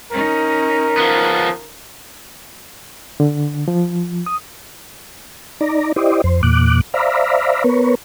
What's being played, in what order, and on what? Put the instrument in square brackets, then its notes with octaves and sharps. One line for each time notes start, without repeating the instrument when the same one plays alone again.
[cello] C#4 D#4 [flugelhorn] A#4
[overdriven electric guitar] F3 B3
[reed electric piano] D3
F3
D#6
[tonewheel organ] D#4 D5 A#5
E4 G4 C5 D5 D#5
F2 C5
E2 A#2 D6 F#6
C5 D5 E5 F5 A#5 B5
B3 A#4 B4 C#5